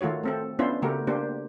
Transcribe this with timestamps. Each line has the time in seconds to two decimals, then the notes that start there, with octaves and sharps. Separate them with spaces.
0.01 D#3 A3 F4 F#4 C#5
0.23 A3 C4 A4
0.59 B3 C#4 D4 E4 F4 C5
0.82 C#3 A3 F#4 G4 A#4
1.07 A#3 D4 G4 C5